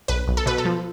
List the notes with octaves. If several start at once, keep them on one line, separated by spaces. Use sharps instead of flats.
B1 B4
B1
A4
B2 B4
A4
F3